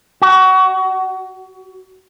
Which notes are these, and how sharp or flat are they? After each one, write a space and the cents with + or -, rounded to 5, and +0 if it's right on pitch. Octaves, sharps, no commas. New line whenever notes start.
F#4 +25